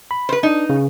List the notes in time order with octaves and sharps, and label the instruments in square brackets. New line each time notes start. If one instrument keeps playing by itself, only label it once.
[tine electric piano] B5
[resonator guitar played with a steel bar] B4 C5
[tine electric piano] D4 [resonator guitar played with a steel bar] D#4
[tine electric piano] C#3